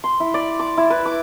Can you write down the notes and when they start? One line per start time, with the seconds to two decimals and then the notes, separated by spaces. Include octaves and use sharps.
0.04 C6
0.20 E4
0.34 D5
0.60 D6
0.78 E4
0.90 B4
1.06 D6